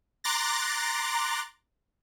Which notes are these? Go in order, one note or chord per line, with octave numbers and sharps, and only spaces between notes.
A#5 C6 D6 F#6 A6 A#6